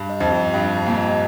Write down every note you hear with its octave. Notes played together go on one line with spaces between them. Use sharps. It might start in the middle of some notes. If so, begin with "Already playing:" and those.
Already playing: G2
D#5
F2
G4
G2 G5
G4
A#2
D#5